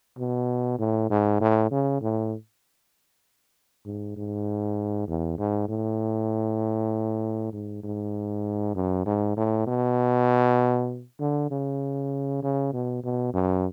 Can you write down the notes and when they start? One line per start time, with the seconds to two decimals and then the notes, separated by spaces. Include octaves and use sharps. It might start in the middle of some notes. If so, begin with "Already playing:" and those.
0.18 B2
0.79 A2
1.10 G#2
1.41 A2
1.71 C#3
2.02 A2
3.85 G#2
4.16 G#2
5.08 E2
5.38 G#2
5.69 A2
7.53 G#2
7.84 G#2
8.75 F#2
9.06 G#2
9.37 A2
9.67 B2
11.20 D3
11.51 C#3
12.43 C#3
12.73 B2
13.04 B2
13.34 F#2